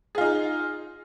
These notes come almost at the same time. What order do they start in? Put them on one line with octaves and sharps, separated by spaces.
G#4 F4 D#4